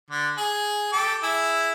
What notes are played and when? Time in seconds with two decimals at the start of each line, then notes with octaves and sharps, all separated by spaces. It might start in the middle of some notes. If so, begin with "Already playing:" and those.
0.11 D3
0.37 G#4
0.93 G4 A4 D6
1.23 E4 G#4 E6